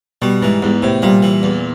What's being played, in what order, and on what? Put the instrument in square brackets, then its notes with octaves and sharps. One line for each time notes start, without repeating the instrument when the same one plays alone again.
[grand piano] B2 [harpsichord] G3
[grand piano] G#2 [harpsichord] E3
[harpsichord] E2 [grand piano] G#2
[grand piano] A2 [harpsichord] C3
[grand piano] A#2 [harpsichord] G3
[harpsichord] E3
E2